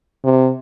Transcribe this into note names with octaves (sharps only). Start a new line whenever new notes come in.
C3